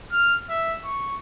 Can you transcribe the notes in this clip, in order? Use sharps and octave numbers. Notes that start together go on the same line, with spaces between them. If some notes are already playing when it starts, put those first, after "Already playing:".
F6
E5
C#6